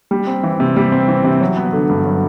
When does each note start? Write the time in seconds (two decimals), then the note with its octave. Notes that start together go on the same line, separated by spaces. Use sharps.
0.11 G3
0.27 C4
0.43 E3
0.60 C3
0.76 G3
0.92 C4
1.08 E3
1.24 C3
1.41 F#3
1.57 B3
1.73 D3
1.89 G2
2.05 F#3